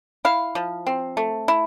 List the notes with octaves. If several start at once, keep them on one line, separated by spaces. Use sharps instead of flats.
E4 F5
F3
C4
A3
E4